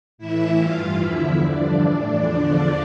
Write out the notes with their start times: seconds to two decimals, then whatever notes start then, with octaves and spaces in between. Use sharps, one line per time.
0.18 A2 E3 E4 E5
0.58 G2 E3 F4 F5
0.98 E2 D3 F3 E4 E5
1.39 G2 D3 F3 D4 D5
1.80 A2 E3
2.19 E2 D3 F3